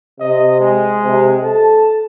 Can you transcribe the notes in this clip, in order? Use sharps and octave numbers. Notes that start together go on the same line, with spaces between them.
C3 D#5
G#3
C3
A4 A5